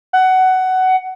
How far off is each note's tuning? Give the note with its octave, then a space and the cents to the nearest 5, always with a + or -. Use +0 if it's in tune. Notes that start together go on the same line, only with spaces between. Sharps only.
F#5 +15